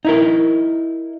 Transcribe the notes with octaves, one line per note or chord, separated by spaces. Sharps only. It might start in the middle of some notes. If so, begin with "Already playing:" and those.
D#4 E4 A#4